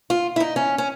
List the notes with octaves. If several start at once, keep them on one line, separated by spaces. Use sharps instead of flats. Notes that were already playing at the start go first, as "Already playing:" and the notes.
F4
E4
D#4
C#4
C#4